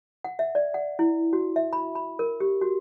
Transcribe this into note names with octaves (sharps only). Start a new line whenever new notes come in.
F#5
E5
D5
F#5
E4
F#4
E5
B5
B5
A#4
G4
F#4